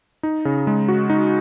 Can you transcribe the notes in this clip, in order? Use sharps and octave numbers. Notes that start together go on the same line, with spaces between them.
D#4
C#3
G#3
F#4
D#4